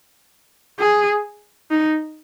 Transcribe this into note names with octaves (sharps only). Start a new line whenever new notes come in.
G#4
D#4